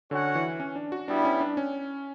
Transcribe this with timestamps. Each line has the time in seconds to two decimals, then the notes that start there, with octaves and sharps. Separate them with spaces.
0.11 D3 C#4 F#4 C#5 F#5
0.35 E3
0.60 C#4
0.76 D4
0.92 F#4
1.08 G3 B3 D4 E4
1.25 C#4
1.40 D4
1.57 C#4